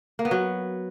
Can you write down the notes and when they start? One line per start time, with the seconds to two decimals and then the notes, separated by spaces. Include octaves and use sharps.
0.19 A#3
0.25 B3
0.31 F#3